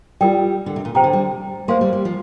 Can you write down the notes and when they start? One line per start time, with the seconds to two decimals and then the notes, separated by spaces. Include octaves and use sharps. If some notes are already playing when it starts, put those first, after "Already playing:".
0.21 G3 F4 A#4 D5 G5
0.66 D3
0.76 C3
0.85 A#2
0.95 C3 C5 G5 A#5
1.04 D3
1.13 G3
1.68 A#3 C5 F5 C6
1.81 G3
1.93 G3
2.05 F3